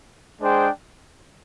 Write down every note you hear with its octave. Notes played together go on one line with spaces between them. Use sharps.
G#3 D4 G#4 C5 G5